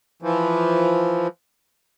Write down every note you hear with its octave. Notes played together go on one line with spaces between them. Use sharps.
E3 F3